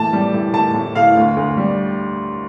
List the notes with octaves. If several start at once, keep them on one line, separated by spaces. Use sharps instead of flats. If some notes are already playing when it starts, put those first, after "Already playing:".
Already playing: A2 E3 A5
G3
A2
A2 A5
A2
A2 F5
D2
D2
G3